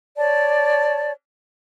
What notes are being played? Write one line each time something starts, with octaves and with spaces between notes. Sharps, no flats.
C#5 D5 A5